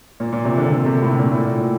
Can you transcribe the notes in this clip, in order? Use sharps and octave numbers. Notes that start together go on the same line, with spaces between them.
A#2
A#2
C3
D3
D3
C3
A2
A#2
A2
A#2